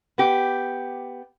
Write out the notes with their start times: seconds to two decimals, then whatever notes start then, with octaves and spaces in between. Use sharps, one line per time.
0.18 B3 G4